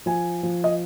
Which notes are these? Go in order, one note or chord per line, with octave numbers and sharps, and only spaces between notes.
F3 G#5
F3
D#5